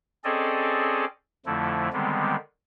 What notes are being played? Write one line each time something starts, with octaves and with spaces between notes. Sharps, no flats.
C4 C#4 G#4 A4 D5 D#5
F2 D3 F3 A3 E4
D3 D#3 G3 G#3 B3 C4